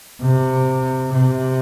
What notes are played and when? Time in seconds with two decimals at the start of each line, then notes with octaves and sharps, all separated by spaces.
0.21 C3
1.12 C3